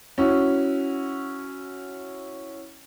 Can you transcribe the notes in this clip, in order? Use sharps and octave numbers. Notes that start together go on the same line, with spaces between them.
C#4 E4 F#4